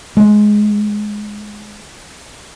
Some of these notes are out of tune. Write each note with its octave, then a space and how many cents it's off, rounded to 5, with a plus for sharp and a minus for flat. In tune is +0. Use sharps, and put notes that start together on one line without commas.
G#3 +10